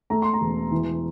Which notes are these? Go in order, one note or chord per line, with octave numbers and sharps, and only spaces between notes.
A3 A#5
C6
A#5
E1
E3